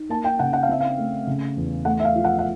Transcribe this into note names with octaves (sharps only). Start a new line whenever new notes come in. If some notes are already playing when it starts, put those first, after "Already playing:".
Already playing: D#4
A#3 A5
G5
C#3 F#5
F#5
F5
C4 E5
F5
A3
C#3
E2
A3 F#5
E5
F5
F3
F#5
F#5